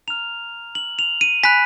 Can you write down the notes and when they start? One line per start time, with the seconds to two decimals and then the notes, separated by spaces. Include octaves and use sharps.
0.08 A#5 F6 F7
0.75 F#7
0.99 F7
1.21 D#7
1.43 G#5 B5 F#6 B6